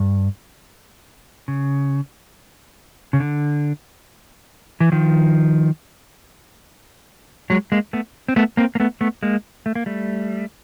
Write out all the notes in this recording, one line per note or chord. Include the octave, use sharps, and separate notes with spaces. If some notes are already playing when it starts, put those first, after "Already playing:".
Already playing: G2
C#3
C#3
D3
E3
D#3 F3
F#3 G#3
G#3 A#3
A3 B3
C4
A3 B3
A#3 C4
A#3
A3 B3
A3 B3
G#3 A#3
A3
A#3
G3 A3